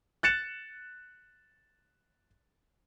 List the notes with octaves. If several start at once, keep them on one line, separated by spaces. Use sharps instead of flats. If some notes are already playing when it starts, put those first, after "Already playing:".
F#6 A6 C#7 E7